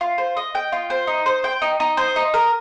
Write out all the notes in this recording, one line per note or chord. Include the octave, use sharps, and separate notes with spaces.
F4
C5
D#5
G5
F4
C5
D#4
C5
G5
D#4
D#4
C5
D#4
A#4